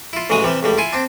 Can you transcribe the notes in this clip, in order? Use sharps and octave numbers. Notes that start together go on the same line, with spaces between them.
E4 F4
A1 C#3 E3 F#3 G#3 D#6
C3 E3 G3
C#2 A2 G3
E4 F4 G#5
C4 D4